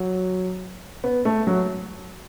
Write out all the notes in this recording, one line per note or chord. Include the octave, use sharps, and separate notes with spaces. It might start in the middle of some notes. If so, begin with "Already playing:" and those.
Already playing: F#3
B3
A3
F#3